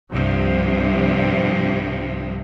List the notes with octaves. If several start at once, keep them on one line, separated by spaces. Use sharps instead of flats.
C2 G2 C3 F3